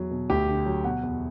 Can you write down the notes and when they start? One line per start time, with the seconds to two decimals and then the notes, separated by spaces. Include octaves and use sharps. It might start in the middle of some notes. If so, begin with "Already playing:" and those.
Already playing: E2 F#3
0.11 B2
0.30 D2 G4
0.48 D3
0.66 F#3
0.84 B2 F#5
1.03 E2